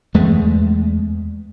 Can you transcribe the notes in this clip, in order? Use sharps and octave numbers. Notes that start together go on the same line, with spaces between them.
E2 G#3 A3